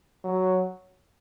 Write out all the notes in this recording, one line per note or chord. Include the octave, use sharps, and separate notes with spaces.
F#3